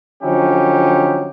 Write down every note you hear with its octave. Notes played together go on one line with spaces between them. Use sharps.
D3 F3 F#3 C#4 D#4 G4